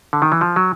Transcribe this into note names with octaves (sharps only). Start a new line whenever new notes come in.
D3
D#3
E3
F3
F#3